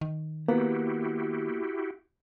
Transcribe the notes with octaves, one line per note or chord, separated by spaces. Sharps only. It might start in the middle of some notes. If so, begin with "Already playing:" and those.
D#3
A#3 B3 E4 F#4 G4